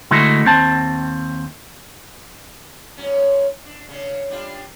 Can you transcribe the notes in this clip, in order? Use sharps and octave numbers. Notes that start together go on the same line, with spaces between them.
D3 G#3 A3 E4 F#4
D#2 C4 A5
G#2 F#3 C#4
D4
C#3 D4
G3 D4 F4